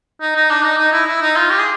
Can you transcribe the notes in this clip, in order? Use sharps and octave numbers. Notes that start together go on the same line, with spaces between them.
D#4
D#4
D4
D#4
D#4
E4
E4
D#4
F4
G4
G#4